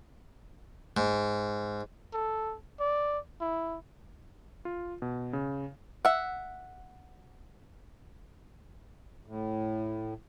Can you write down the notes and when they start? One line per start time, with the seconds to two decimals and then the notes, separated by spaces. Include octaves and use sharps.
0.97 G#2
2.13 A4
2.80 D5
3.41 E4
4.65 F4
5.02 B2
5.33 C#3
6.05 E5 F#5
9.26 A2